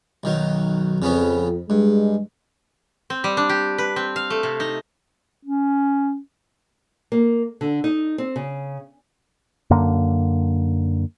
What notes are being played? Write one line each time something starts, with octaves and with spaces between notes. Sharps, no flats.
B1 D#3 F#3
F2 C#3 B3 C#4
G2 G#3
C4
G3
D4
G4
B4
C4
F5
A3
C3
D#4
C#4
A#3
D3
D#4
C4
C#3
F#2 D3 A#3